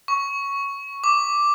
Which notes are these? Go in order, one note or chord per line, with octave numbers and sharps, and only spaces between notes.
C#6
D6